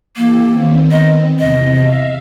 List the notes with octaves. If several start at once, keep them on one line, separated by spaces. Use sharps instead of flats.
E3 A#3 G4 A4
D#3 B3 C4
D#5
E2 C3 D#5
E5 F5